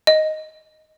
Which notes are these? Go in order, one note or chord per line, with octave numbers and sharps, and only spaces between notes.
D#5